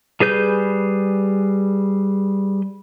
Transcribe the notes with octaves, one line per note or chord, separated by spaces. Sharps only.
G3 G#4 B4 G6